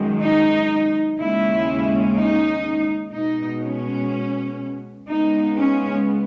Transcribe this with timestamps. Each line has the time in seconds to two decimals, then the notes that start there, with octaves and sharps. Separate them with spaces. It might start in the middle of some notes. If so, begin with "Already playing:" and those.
Already playing: F#2 D#3 G#3
0.21 D#4
1.18 D#2 C#3 G#3 C#4 E4
2.16 D#4
3.13 B2 G#3 B3 D#4
3.62 C#4
5.08 C#3 G#3 B3 D#4
5.56 C#4